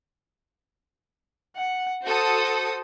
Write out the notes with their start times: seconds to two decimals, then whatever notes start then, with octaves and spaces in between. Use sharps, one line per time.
1.56 F#5
2.05 F#4 A4 C5 D#6